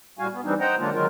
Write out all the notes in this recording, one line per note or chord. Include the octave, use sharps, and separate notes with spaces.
A2 G3 F#4 F5 G#5
B3
E3 G3 C4 D4 D#4
C5 D#5 F#5 G5 A#5
D3 F#3 G#3 A#3 D4 F4
D#3 F#3 G#3 F4 A#4